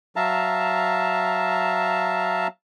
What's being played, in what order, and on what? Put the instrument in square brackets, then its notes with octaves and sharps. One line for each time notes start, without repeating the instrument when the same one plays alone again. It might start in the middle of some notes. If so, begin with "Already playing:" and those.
[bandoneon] F#3 E5 F5 A5 A#5